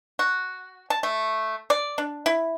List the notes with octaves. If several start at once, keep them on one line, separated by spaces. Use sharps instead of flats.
F#4
A5
A3
D5
D4
E4